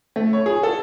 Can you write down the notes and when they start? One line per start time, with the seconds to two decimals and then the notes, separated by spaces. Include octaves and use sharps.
0.16 A3
0.33 C#5
0.46 G#4
0.63 A4